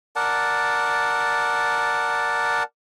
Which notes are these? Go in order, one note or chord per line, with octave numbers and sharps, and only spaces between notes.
A#4 D5 F#5 A5